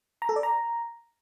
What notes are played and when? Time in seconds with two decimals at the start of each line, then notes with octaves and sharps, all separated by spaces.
0.22 A#5
0.29 A4
0.36 D5
0.43 A#5